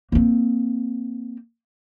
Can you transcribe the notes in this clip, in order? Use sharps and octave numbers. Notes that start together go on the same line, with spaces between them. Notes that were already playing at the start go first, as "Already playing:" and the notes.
A#3 C4